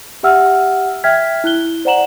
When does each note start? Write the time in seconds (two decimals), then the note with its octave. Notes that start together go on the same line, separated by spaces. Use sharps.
0.23 G4 E5 F#5 E6 F6
1.04 E5 G5 F6 G#6 B6
1.44 E4 F#6 G7
1.85 C5 D5 F#5 A#5 E7 F#7